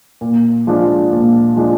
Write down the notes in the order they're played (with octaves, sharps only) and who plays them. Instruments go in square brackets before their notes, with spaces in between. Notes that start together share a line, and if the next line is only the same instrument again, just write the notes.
[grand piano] A#2
F3 G#3 D4 F4
A#2
F3 G#3 D4 F4